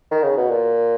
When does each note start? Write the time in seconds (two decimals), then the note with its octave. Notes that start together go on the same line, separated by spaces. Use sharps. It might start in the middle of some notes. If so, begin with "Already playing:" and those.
0.11 D#3
0.23 C#3
0.37 B2
0.50 A#2